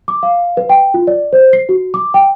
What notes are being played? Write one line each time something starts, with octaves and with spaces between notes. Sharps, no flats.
D6
F5
B4
G5
F4
D5
C5
C7
F#4
D6
G5